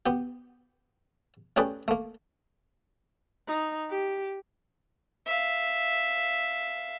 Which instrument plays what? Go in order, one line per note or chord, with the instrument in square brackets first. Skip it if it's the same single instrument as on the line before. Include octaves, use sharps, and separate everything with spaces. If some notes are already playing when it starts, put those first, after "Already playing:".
[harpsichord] B3 G4
A3 C#4 G4 G#4 B4 D5
A3 A#3
[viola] D#4
G4
[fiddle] E5 F5